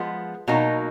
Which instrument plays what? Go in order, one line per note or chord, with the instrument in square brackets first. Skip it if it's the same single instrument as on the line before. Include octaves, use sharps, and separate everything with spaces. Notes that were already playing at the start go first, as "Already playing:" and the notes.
Already playing: [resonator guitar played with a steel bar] F3 G#3 B3
B2 F#3 A#3 D#4